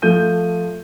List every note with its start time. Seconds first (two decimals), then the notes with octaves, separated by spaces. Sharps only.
0.02 F3 A3 F4 G6 D#7